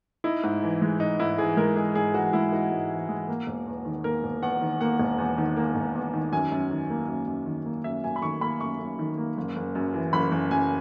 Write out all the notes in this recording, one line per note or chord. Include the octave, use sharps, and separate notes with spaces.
D#4 E4
G#2
E3
G#3
D#4
G#2 E4
E3 G#4
G#3 A#4
D#4 G#4
G#2 G#4
E3 F#4
G#3 E4
D#4 F#4
G#2
E3
G#3
A#3
E1
E2
D#3
A#3 A#4
E1
E2 F#5
D#3
A#3 F#5
E1
E2
D#3
A#3
E1
E2
D#3
F#2 G#5
F#2
D#3
A#3
F#2
F#2
D#3
A#3
F#2 E5
F#2 G#5
B5
D#3 C#6
A#3 B5
F#2 C#6
F#2
D#3
A#3
F#1
F#1
F#2
E3
F#1 B5
F#1
F#2 G#5